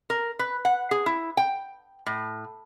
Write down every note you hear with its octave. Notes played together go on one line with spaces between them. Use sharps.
A#4
B4
F#5
G#4
E4
G5
A2